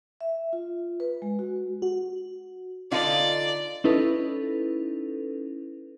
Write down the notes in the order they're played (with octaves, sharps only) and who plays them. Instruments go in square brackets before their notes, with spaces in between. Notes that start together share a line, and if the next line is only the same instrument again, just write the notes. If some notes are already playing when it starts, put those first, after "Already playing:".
[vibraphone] E5
F4
B4
G#3
F#4
[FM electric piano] F#4
[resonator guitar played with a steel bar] D3 D#4 F4 [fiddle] D5
[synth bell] C#4 D#4 E4 A4 B4